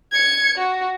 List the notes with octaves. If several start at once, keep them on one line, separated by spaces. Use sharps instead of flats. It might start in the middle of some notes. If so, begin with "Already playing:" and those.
G#6 C#7
F#4